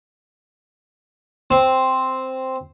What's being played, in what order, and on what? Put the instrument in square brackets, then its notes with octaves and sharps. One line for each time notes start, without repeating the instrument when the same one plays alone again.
[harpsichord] C4